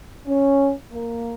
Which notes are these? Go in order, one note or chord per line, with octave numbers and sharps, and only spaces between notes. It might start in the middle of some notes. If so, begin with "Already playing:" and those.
C#4
A#3